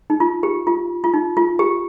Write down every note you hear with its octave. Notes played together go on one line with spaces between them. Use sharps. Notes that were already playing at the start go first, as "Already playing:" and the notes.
D#4
F4
G4
F4
F4
D#4
F4
G4